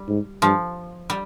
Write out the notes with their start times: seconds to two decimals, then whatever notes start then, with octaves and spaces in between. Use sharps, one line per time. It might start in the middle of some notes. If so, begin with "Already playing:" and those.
Already playing: G3
0.08 G#2
0.42 G2 F3
1.10 G3